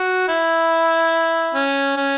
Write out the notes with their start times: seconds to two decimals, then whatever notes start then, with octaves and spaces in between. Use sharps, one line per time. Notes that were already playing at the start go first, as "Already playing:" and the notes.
Already playing: F#4
0.28 E4
1.55 C#4
1.97 C#4